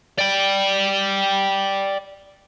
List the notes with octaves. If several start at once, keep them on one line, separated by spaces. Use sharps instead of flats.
D5 G5